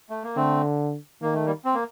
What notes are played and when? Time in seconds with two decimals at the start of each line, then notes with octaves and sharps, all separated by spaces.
0.10 A3
0.23 A#3
0.36 D3 A3 C4
1.22 D#3 A#3
1.34 A3
1.46 G3 A#3
1.65 C4
1.74 A#3